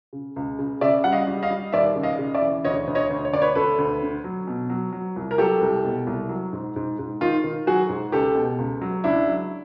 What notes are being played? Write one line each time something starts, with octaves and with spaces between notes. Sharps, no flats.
C#3
C#2
C#3
C#3 D5 E5
G3 F#5
D#5 F5
G3
D#5 F5
G3
D#2 D5 E5
C#3
D#5 F5
C#3
D5 E5
E3
D2 C#5 D#5
D2
C#5 D#5
D2
C#5
D2 D5
B4 C#5
D2 A4 B4
D2
D3
F#3
B2
F#3
F#3
C2
A#4
F#3 G4 A4
C2
B2
C2
F#3
G#2
G#2
G#2
D#3 D#4 F4
D#3
F#3 F#4 G#4
G#2
C#2 G4 A4
B2
C#2
F#3
C#2 D4 E4
F#3